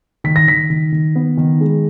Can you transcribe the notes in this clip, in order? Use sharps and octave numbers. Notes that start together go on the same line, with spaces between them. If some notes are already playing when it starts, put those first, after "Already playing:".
D#3 B6
A#6
D#3 B6
D#3
D#3
B3
D#3
G#3